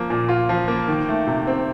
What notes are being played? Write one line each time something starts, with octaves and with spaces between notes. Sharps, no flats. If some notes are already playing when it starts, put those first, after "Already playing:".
Already playing: F3 A#3
A#2
F4
F3
A#3
D#3
A3
C3
C4